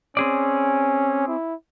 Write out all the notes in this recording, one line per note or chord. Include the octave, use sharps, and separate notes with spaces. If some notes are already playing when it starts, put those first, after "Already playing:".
C4 C#4 G#4 D5
E4